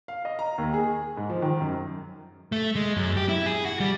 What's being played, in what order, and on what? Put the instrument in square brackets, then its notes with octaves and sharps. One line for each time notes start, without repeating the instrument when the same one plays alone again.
[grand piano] F5
D#5
A#5
D#2
G#4
G#2
F3
D#3
F#2
[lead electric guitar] A3
G#3
F#2
G4
E4
G#4
F#4
G3